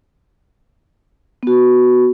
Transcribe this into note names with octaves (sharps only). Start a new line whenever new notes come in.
B3 F#4